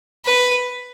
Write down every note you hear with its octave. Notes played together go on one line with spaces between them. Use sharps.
B4